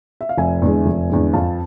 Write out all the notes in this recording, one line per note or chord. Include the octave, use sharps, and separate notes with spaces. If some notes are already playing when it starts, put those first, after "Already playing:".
E5
F5
F1 E5 G#5
E2 D3 G#3
F1
E2 D3 G#3
F2 F5 A5